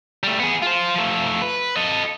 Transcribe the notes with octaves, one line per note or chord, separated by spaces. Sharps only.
G3 A3
B3 G#4
F4 C5
F3 A3
B4
A4 D#5